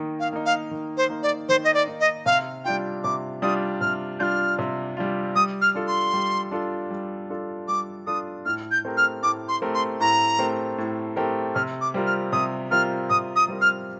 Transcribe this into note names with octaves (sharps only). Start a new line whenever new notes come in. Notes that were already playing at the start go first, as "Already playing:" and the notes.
Already playing: D#3 A#3 D#4
F5
A#3 D#4
F5
D#3
C5
A#3 D#4
D5
D#3 C5
D#5
D5
A#3 D#4
D#5
C3 F5
G3 D4 F4 G5
C3 D6
G3 D4 F4 D#6
C3 F6
G3 D4 F4 F6 G6
C3
G3 D4 F4
G3 D#6
F6
D4 F4 A4
C6
G3
D4 F4 A4
G3
D4 F4 A4
G3 D6
D4 F4 A4 D#6
A2 F6
G6
A3 C4 G4 A#4
F6
A2 D6
C6
A3 C4 G4 A#4
C6
A2 A#5
A3 C4 G4 A#4
A2
A3 C4 G4 A#4
C3 F6
D6
G3 C4 F4 A#4
F6
C3 D#6
G3 C4 F4 A#4 F6
C3 D#6
D#6
G3 C4 F4 A#4
F6